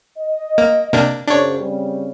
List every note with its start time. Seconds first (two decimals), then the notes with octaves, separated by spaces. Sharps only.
0.17 D#5
0.58 A#3
0.93 C3 A#3 D4
1.28 F#2 C#3 D4 C5 C#5
1.61 C#3 G3 C4